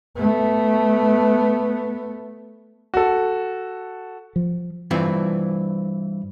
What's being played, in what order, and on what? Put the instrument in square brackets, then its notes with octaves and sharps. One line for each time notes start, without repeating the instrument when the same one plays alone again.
[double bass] A3 B3
[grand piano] F#4 A4
[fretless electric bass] F3
[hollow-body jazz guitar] G2 E3 C4 F4